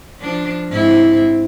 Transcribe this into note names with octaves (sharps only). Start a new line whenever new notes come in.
F3 D4
G#2 C4 E4